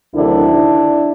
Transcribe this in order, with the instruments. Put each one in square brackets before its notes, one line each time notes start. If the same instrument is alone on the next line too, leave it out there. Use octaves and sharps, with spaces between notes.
[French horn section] D2 C3 D#3 F#3 D4 E4